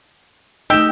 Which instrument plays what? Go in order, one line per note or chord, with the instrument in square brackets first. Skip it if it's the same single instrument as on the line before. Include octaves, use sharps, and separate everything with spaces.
[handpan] A3 D#4 D#5 [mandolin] G4 [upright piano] E6 E7